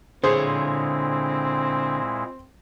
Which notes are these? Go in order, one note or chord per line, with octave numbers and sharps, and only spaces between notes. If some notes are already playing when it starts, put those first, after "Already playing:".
A#2 D3 G#3 C4 E4 G#4 C5 C#5